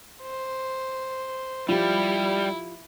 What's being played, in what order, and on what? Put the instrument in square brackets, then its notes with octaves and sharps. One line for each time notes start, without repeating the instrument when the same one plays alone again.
[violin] C5
[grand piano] F3 G4 [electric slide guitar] G3 [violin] E4